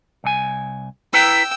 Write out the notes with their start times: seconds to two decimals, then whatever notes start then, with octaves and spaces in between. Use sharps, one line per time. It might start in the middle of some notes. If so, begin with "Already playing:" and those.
0.24 C2 G#5
1.13 E4 B4 G5 A#5 E6